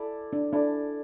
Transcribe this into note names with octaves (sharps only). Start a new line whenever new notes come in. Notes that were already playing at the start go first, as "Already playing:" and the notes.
Already playing: E4 A4 D5
D4
D4 E4 A4 D5